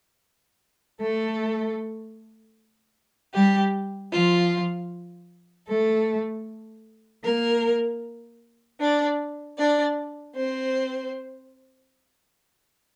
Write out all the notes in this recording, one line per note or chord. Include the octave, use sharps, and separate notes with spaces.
A3 A4
G3 G4
F3 F4
A3 A4
A#3 A#4
D4 D5
D4 D5
C4 C5